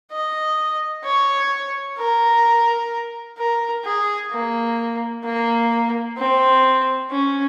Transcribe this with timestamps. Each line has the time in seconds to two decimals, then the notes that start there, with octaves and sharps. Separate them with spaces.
0.12 D#5
1.04 C#5
1.98 A#4
3.38 A#4
3.85 G#4
4.31 A#3
5.24 A#3
6.18 C4
7.11 C#4